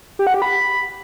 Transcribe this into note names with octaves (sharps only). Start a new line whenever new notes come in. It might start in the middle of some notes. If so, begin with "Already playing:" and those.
G4
F#5
G4
B5